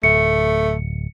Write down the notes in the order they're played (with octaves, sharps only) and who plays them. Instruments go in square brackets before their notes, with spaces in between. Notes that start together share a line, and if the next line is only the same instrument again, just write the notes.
[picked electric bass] D1 [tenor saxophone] A3 [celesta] C#7